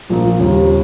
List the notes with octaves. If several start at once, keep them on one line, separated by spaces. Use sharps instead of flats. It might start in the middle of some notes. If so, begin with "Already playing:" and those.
A#1 A#2 F3 A#3
D#2 C#3 G3